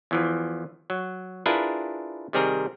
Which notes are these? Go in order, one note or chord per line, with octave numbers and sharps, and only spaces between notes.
E2 E3 F3
F#3
D4 E4 F4 G#4 A#4 B4
C3 D#3 G3 C4 G#4 A#4